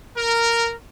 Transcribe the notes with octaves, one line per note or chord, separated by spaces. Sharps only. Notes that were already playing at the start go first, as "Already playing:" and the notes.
A#4